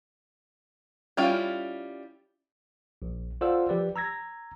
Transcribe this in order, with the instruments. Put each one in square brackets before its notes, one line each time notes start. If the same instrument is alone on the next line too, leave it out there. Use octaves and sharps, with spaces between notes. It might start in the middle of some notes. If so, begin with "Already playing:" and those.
[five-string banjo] G3 C#4 E4 F4 G5
[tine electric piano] A#1
F4 A4 C5 D5 F#5 E6
F3 G4 B4 D5
A#5 E6 G#6 A#6